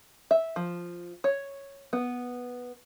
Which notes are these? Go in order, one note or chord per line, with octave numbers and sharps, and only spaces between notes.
E5
F3
C#5
B3